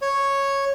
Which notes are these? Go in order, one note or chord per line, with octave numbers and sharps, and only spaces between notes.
C#5